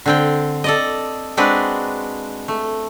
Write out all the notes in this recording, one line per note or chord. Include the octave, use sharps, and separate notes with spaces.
D3 C4 G5
A4 D5 D#5
G#3 C4 D4 F#4 B4
A3